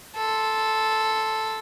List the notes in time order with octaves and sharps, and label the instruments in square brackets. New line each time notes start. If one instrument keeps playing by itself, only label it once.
[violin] A4 C6